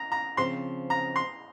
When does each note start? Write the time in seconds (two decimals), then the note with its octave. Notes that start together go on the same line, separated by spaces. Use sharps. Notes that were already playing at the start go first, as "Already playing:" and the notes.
Already playing: A#5
0.12 A#5
0.37 C#3 F3 C4 C6
0.90 A#5
1.16 C6